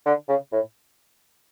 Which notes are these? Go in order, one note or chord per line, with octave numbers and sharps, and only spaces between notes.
D3
C#3
A2